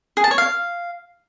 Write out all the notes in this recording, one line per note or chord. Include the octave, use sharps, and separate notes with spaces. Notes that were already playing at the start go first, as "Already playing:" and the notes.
G#4
A5
C#5
F5